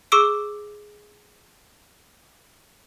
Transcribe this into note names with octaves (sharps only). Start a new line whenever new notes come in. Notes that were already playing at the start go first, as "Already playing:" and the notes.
G#4 C#6 D6 E6 D7